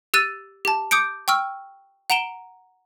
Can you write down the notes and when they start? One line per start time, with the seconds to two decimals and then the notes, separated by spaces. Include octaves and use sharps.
0.14 G4 E6 F#6 A6 D#7
0.65 G4 A5
0.91 D6 D#6 G6 C#7 D7
1.28 G5 C#6 E6 F6
2.10 F#5 A#5 D7 E7 G7